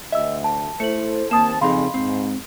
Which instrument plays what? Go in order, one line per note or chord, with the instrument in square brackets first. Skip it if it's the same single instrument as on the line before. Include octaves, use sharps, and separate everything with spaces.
[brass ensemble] D2 [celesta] D#5 E6 [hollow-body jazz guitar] E5
[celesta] A5
[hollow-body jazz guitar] A3 [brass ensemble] E4 A4 C5 [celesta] C#7 F#7
[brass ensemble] D#2 C4 A5 [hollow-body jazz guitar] A#3 [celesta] D#6 E7
[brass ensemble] F2 G#4 [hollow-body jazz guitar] C#3 C4 D#4 [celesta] F5 B5 C6
[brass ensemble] G#2 [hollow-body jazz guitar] C4